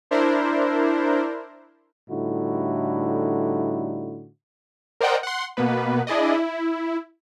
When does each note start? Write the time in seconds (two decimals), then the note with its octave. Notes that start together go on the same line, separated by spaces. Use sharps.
0.11 D4 E4 A#4 C5
2.09 A2 D3 G3 D#4 E4 F#4
5.01 A#4 C5 D5 D#5 F#5 G5
5.23 F#5 C6
5.57 B2 A#3 B3 B4
6.07 D4 E4 G#4 D5 D#5
6.34 E4